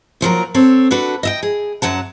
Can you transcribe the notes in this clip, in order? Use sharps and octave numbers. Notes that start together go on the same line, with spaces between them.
D#2 F3 F#3 A#4
C4 A4 C#5
D4 F#4 A4 B4
D#5 E5 G5
G#4
F#2 F#3 F#5 A5